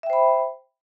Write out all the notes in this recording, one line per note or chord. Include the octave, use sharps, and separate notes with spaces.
C5 E5 G5 B5